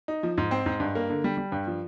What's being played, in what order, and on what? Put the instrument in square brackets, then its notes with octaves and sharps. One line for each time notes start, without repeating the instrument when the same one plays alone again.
[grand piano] D#4
F3
G#2
C4
G#2
G2
A#3
D3
G3
G3
G2
F3